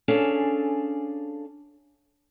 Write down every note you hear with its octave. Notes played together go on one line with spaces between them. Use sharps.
C#4 D4 G#4 A4 F5